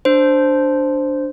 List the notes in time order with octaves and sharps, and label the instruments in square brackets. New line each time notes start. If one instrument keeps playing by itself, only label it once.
[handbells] D4 C5